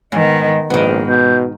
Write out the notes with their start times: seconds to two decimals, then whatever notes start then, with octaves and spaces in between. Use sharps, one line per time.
0.12 G#2 D#3 B3 D#5
0.70 A#1 G#2 D#3 B3
1.08 B2 G6